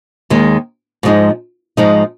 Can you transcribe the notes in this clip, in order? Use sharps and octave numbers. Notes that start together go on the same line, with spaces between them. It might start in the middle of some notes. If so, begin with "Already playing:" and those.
D#2 D#3 G#3
G#2 F3 G#3 D#4
G#2 F3 G#3 D#4